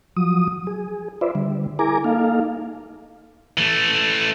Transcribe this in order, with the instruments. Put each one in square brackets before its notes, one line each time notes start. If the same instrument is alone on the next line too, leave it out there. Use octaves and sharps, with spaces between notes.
[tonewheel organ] F3 F#3 D#6
G#4
F4 B4 C5 D5 E5
D3 G3
E4 G#4 A#4 G#5 A#5 D6
A#3 D#4 A4 F5
[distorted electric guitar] E3 A3